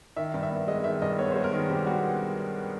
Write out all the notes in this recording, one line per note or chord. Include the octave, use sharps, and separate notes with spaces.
D#3 E5
G2
E5
B3
G#3 D#5
D#3 E5
G2 D#5
B3 C#5
G#3 C5
A#4
D#3
G2 G4
B3 F#4